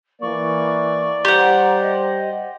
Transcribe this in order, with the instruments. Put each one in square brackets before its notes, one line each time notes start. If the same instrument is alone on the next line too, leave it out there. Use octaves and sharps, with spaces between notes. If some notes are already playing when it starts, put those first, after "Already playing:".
[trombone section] E3 A#3 [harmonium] D5 [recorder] C#6
[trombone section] G3 C5 [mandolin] G4 F#5 [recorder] A#5
[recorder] D#5